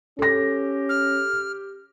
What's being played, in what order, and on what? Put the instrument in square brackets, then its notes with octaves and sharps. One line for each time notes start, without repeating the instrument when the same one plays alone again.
[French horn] C#4 [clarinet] G4 [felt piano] A4 A#6
[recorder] F6